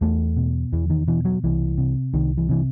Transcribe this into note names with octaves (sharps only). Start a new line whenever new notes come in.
E2 A3
B2
E2 E3
D#3
B2 E3
F#3
C2 E3
C3
C2 D#3
E3
C3 E3